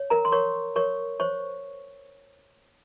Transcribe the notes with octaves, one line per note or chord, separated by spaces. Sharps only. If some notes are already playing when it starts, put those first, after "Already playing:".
Already playing: C#5
A#4 A#5
C6
A#4 C#5 C#6
A#4 C#5 C#6
C5 C#5 C#6